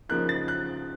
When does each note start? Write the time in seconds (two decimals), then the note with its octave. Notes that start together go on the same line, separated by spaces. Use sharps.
0.09 C#3 F3 A#3 D#4 F#6
0.29 A6
0.48 F#6